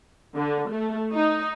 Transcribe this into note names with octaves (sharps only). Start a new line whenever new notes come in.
D3
A3
D#4